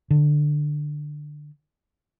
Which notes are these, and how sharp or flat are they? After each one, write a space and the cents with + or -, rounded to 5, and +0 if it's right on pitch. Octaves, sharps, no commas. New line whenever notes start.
D3 +15